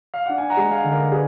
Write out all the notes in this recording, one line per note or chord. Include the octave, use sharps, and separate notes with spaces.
F5
D4 F#5
G#5
F#5 A#5
G#3
F5 G#5
D3
A#4 D5
D4 G#4 B4